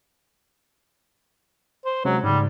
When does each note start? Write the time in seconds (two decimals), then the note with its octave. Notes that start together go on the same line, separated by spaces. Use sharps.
1.85 C5
2.05 C3 F#3 G#3 C#4
2.24 G#2 C#3 G3